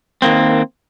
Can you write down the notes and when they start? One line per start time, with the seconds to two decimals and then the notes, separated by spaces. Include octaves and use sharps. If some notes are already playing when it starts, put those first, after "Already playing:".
0.22 D#3 A#3 C4